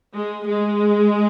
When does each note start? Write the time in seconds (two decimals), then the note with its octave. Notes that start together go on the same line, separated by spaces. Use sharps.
0.15 G#3
0.48 G#3